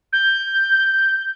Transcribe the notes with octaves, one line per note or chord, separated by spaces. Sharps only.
G6